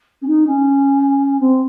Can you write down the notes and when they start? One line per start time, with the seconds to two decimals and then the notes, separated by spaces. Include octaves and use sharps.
0.22 C#4
0.27 D#4
0.46 C#4
1.40 C4